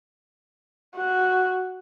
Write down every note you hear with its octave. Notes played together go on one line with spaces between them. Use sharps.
F#4